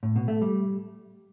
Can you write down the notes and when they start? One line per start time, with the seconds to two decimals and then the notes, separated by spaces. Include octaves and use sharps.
0.03 A2
0.16 B2
0.28 A3
0.42 G3